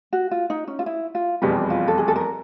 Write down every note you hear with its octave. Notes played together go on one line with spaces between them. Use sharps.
F#4
F4
D#4
C#4
F4
E4
F4
F1 E2 B2 G3 G4
F4
A4
G#4
A4
A#4